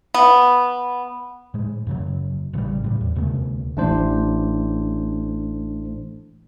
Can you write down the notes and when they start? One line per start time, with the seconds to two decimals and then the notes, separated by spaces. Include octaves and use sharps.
0.14 B3
1.54 A2 G#3
1.87 F#2 C#3 F#3
2.53 A1 C#3 E3 G3
2.84 A2 G3
3.01 E2
3.15 D2 C3 G#3 A#3
3.77 A1 A2 A3 D4 C5